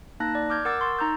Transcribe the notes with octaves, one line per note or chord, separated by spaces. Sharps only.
A#3 D#4 A5 F#6 A#6
D5
D6 F6 G6 G#6
A#4 F#5 D6 E6 A6
C6 C#6 A6
D#4 A#5 E6 G6